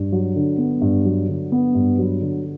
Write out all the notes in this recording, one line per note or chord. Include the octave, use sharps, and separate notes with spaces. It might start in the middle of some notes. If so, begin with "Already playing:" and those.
Already playing: G2
F#3
D3
B3
G2
F#3
D3
B3
G2
F#3
D3